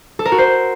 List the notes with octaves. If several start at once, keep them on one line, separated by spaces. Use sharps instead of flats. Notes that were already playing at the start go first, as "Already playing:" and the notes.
A4
A#4
F#4
C5